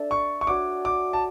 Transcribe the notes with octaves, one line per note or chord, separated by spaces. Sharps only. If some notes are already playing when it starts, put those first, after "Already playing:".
Already playing: D4 A4 E5
C#6
C#6
D4 F#4 C#5 D6
D6
A5